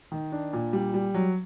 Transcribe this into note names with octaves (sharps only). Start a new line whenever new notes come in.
D#3
D4
A#2
G3
G3
F#3